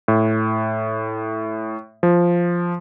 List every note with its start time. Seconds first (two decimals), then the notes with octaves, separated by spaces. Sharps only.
0.08 A2
2.03 F3